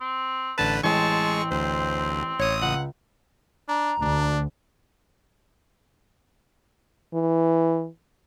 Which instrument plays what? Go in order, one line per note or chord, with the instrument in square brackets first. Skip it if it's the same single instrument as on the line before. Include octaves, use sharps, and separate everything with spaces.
[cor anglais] C4
[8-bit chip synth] A1 D3 B4 [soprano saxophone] A5
[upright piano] A1 [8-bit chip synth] G#3 C#6 [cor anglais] C4 [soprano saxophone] A5
[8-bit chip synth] D2 [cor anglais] C4 [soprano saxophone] C5
[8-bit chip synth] A1 D#6 [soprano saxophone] C#5
[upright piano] C#2 [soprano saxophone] F#5
[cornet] D4 [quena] A#5
[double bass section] D2 [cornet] D4
[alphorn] E3